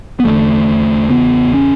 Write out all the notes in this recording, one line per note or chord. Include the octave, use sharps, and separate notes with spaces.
B3
E2 D3 A3
E2 C#3 B3
C#4